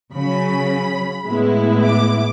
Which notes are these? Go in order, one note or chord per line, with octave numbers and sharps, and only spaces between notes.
C#3 F#3 C#4 B5
A2 G#3 B3 E4
D6